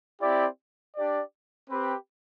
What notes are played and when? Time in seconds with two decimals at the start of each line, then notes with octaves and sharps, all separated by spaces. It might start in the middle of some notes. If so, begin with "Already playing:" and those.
0.21 C4 E4 G4 D5
0.96 D4 G4 D5
1.69 C4 G4 B4